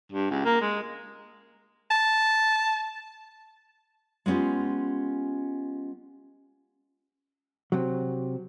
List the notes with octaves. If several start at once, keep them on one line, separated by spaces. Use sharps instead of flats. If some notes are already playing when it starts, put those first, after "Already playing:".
G2
C#2
A#3
G#3
A5
G#3 B3 C#4 F4 G4
C3 F#3